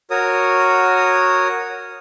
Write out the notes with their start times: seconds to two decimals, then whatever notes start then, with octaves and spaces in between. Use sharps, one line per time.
0.11 F#4 A#4 C#5 D#6